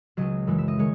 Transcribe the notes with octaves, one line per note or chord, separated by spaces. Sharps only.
C#2 C#3 F#3 D#5
F#2 E3 G#3
E5
D#5
D#3 G#3 C#5